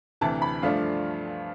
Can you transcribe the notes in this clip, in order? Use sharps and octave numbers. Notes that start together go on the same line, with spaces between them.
D2 C3 E3 A5
B5
G2 F3 A3 D4 F4 F5